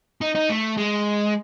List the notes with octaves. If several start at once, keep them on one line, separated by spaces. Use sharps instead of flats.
D#4
D#4
A3
G#3